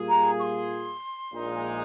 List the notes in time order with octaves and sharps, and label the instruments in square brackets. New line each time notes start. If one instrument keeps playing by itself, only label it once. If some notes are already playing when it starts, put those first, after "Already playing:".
Already playing: [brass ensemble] A#2 G3 A#3 F4 G#4
[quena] A#5
C#6
C6
[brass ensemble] A#1 A#2 G#3 D#4